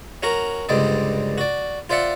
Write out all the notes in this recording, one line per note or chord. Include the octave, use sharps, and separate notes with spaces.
C#4 F#4 A#4 A#5
C#2 G2 D3 C4 D5 D#5
F#4 D5
F4 C5 D5 E5 F#5